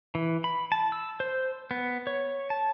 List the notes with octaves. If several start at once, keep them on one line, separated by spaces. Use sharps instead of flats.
E3
B5
A5
E6
C5
B3
C#5
A5